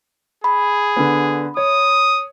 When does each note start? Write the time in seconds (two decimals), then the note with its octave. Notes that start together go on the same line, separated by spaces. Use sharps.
0.44 G#4 B5
0.96 D3 B3
1.57 C#5 D#6